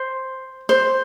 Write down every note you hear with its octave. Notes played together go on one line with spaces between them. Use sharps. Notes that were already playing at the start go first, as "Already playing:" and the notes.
Already playing: C5
C5